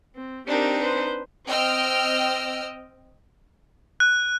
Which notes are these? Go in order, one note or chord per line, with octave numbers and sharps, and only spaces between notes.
C4
C4 D4 D#4 G4 A#4
B4 C5
C4 D#5 G5 E6 F6
F#6